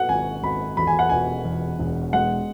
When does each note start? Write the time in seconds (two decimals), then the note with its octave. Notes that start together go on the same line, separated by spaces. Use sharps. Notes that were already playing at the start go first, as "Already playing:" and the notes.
Already playing: F#5
0.09 G#1 G#5
0.43 G#1 B5
0.77 E2 B5
0.87 G#5
0.99 F#5
1.09 E1 G#5
1.45 E2
1.79 E1
2.13 G#3 F#5